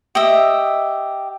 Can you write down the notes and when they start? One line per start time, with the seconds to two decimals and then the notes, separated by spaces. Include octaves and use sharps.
0.15 G4 D#5 E5